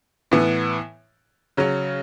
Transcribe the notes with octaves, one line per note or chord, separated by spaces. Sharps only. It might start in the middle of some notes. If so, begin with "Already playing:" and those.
A2 E3 B3
C#3 F#3 C#4